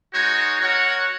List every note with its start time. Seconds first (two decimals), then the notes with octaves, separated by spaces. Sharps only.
0.13 G#3 D#4 F#4 C#5
0.60 F#4 A#4 C#5 F#5